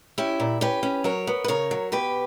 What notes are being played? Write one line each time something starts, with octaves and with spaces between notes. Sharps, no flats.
C#4 E4 G4
A#2
C#4 G4 B4
C#4
F#3 A#4 C#5
B3
B4
C#3 A#4 C#5
F#3
B2 G4 B4